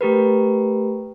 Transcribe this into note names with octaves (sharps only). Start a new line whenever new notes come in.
A3 G4 A#4 B4